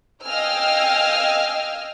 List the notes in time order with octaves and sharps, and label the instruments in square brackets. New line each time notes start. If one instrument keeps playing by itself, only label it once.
[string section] D#5 F5 G5 G#5 E6 F6